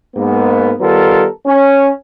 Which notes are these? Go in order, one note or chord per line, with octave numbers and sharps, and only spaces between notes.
G#2 A#3 B3
D#3 G3 B3 F4 A4 A#4
C#4